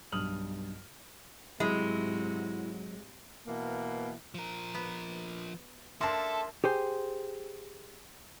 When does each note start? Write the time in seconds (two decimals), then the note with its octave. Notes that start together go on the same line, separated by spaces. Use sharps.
0.12 B1 G2 D#6 F6 F#7
1.60 G#2 C3 F#3 G#3 E4 F#4
3.47 B2 E3 A#3
4.34 F3 A#4
4.74 B3
6.01 A#3 D4 A4 E5 A5 C6
6.64 G4 G#4 C5